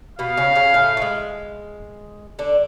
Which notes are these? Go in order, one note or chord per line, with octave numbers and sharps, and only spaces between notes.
B2 B3 F5
C#3 C#4
C#3 C#4
A2 A3
A3
G#3
D3 D4